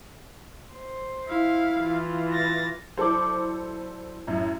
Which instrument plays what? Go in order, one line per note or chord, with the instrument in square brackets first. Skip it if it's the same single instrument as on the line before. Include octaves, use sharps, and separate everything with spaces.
[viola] C5
[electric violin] E4 F5
[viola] E3 F4
[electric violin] A6 A#6
[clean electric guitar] F#3 D5 [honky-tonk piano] E4 A4 C5
[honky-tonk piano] F#2 A2